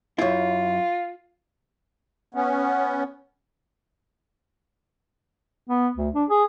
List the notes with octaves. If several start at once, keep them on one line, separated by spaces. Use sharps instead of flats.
F#2 E4 F4
B3 C#4
B3
D2
D4
G#4